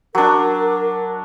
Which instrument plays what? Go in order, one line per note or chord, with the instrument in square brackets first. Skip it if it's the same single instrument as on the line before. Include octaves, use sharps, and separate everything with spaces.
[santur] F#3 D4 [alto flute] A#4